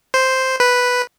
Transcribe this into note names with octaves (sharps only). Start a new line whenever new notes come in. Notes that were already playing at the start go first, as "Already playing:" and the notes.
C5
B4